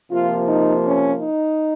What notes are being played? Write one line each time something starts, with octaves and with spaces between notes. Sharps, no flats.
C3 F3 A#3 F4
D#4
C#4
D#4